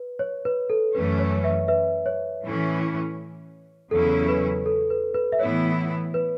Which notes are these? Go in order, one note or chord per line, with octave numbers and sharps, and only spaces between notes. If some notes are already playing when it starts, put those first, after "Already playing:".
Already playing: B4
C#5
B4
A4
F#2 E3 A3 C#4 B4
C#5
B4 E5
B4 E5
C#5
A2 E3 C#4 E4
E2 C#3 F#3 C#4 E4 A4
B4
A4
B4
B4
E5
A2 E3 B3 E4 C#5
B4